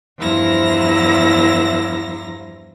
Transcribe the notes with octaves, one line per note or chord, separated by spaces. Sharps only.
E2 G2 F3 E4 A#5 A#6